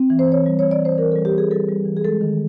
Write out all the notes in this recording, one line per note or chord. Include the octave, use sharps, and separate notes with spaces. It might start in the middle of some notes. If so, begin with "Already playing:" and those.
Already playing: C4
E3
C5
E3 C#5
G3
C#5
E3
D5
E3 C5
E3 A#4
A4
G3
G4
G3 G#4
G3 A4
G3
E3
G#4
G#3 A4
D#3